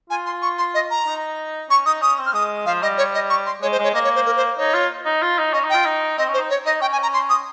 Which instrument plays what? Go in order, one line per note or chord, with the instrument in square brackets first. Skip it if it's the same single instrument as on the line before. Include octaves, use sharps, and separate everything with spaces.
[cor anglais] F4 [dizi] G#5
[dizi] C6
C#6
C6
D#5
A#5
[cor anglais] D#4
[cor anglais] C#4 [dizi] C#6
[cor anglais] D#4 [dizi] D#6
[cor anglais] C#4 [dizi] D#6
[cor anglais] C4
[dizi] F6
[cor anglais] G#3 [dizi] D#6
[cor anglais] F3 [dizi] F5
[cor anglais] G3 [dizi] D#5
[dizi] C#5
D#5
C#6
C6
[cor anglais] G#3 [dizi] C#5
[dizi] C5
[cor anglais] G#3 [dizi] C#5
[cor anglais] A#3 [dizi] D#5
[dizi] C#5
C5
A#4
C5
[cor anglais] D#4 [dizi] C#5
[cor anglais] F4
D#4
F4
D#4
[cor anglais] C#4 [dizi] D#5
[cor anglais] D#4
[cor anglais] F4 [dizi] G5
[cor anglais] D#4
[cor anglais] C4 [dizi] D#5
[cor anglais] C#4
[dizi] C5
[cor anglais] D#4
[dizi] C#5
[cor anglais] D#4 [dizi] D#5
[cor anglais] C#4 [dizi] G5
[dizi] G#5
A#5
C6
D#6